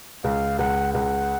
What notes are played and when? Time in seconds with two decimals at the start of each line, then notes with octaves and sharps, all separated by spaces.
0.24 C#2 F5
0.59 C#2 F#5
0.94 C#2 F#5